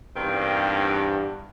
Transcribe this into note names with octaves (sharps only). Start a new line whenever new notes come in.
E2 G2 D#3 C4